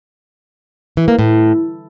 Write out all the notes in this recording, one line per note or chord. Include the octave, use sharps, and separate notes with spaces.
E3
A#3
A2